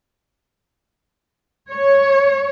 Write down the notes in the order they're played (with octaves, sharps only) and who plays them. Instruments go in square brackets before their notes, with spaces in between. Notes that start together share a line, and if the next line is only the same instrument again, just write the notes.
[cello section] C#5